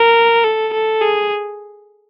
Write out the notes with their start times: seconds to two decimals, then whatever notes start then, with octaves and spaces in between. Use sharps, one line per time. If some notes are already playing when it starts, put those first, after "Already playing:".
Already playing: A#4
0.44 A4
0.73 A4
1.02 G#4